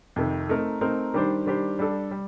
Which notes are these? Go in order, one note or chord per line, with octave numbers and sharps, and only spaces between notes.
F2 C3 D#3
A3 C4 D#4 A#4
A3 C4 D#4 A#4
D#3 G3 D4 G4 C5
D#3 G3 D4 G4 C5
G3 D4 A4
G3